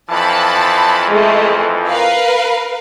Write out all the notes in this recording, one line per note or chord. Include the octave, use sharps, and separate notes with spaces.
F2 E3 F3 A5 B5
G#3 A3
A#4 B4 F5